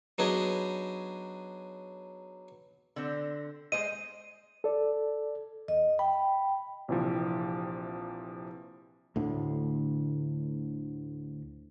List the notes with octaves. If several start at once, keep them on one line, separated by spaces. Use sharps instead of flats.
F#3 B3 D4 D#4 G#4
D3 C4
G#3 C5 D#5 D#7
A4 D5
E2 D#5
G5 B5
A#1 C3 E3 F3
D2 A2 D3